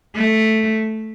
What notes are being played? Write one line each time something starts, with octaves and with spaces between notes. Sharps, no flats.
A3